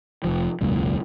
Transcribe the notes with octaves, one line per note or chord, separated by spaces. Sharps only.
F1 F3
E1 C#2 F#2 A#2